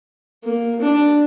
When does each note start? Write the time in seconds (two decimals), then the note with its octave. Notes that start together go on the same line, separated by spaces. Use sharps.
0.44 A#3
0.82 D4